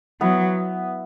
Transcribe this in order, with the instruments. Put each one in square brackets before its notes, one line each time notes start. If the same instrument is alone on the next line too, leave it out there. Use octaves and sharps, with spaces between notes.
[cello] F#3 [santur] B3 E4 B4